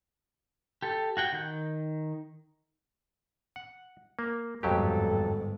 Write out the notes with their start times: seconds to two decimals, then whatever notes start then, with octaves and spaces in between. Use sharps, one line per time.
0.82 G4 A4
1.17 F#4 F#5 G5
1.33 D#3 G6
3.56 F#5
4.19 A#3
4.63 G1 F2 G#2 F#3 G4 A4